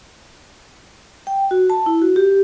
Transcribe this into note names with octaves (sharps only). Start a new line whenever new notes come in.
G5
F#4
A5
E4
F#4
G4